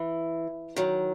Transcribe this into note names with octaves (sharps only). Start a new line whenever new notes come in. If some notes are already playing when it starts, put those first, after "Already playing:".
Already playing: E3
D#3 F#3